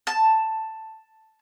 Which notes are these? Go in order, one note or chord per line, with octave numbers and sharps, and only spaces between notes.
A5